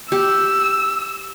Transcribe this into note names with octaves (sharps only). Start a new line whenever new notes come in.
G4 E6